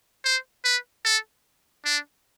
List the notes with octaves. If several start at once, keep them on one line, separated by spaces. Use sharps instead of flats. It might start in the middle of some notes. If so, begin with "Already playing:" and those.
C5
B4
A4
D4